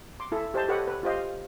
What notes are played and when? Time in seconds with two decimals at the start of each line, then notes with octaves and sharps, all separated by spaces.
0.20 C6 D6
0.32 E4 A4
0.54 G4 C5 D#5 A5
0.69 G4 A4 B4 C#5 D#5 F#5
0.88 B4
1.03 F4 G4 C5 D#5 F5